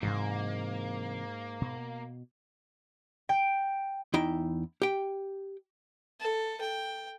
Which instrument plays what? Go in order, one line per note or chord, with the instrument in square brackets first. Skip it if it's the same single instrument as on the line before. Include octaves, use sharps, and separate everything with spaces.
[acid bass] G#2 [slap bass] C3 E3 F#3 [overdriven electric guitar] A#3
[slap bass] B2
[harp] G5
[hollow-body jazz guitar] E2 D#4 E4 G5
G4 G5
[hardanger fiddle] A4
G5